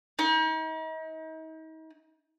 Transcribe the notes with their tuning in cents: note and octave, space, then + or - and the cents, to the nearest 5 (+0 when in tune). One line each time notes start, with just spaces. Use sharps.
D#4 +40